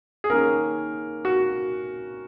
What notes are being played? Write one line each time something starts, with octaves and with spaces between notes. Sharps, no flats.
G#4
D#3 A#3 C#4 A#4
F#4